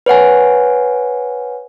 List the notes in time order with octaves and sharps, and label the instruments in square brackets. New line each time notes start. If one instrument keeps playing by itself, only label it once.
[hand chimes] B4 C#5 F#5 G#5